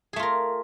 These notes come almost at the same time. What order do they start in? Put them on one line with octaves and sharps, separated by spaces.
G#4 A3 F4 A#4